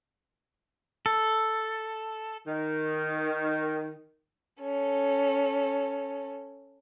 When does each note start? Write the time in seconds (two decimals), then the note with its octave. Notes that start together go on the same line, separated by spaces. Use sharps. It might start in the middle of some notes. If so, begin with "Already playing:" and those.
1.06 A4
2.47 D#3
4.61 C#4 A4